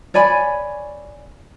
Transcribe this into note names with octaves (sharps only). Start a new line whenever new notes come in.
C#5 D5 G#5 B5